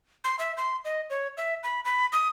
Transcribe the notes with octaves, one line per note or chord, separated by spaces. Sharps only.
C6
E5
C6
D#5
C#5
E5
B5
B5
D#6